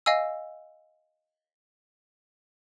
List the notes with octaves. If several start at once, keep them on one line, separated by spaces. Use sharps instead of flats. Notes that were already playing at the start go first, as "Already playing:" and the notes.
D#5 F5 G#5 E6